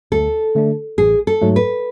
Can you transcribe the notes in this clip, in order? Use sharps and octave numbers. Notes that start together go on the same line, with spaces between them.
D2 A4
D3 A3 D4
A1 G#4
A4
G#2 F#3 A3
B4